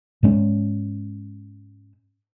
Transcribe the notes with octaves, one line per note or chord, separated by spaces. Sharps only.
G#2 G#3 C#4